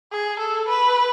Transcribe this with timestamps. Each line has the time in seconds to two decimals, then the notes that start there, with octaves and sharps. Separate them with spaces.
0.12 G#4
0.39 A4
0.69 B4